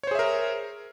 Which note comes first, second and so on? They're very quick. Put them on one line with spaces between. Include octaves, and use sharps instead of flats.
C#5 C5 G#4 E5 A#4